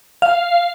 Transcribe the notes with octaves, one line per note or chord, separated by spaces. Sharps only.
F5